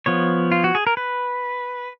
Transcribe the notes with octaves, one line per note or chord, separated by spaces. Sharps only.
F3 B3 C#5
F4
F#4
G#4
A#4
B4